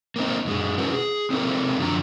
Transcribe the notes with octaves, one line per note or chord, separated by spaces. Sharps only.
A#3 C4 D#4
F#2 G#3
C#4 E4 F#4 A#4 B4
G#4
C4 D#4 G4 A4 A#4
F#2 D3 F3 A#5